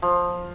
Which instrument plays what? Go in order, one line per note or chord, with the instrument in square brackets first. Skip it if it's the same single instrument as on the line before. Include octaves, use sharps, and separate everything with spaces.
[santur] F3